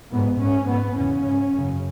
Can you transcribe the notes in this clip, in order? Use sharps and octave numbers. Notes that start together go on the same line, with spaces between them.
G#2 B3
G#2 C#4
G#2 B3
E2 C#3 C#4
G#2
F#2 C#3